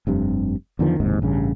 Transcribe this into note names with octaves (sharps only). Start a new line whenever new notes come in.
F1 G2 C3
E2 D3 D#3 F3
F#1 D#2 G#2 C3
A1 G2 C#3